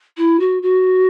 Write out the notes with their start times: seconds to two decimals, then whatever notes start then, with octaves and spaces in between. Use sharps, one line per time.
0.17 E4
0.40 F#4
0.62 F#4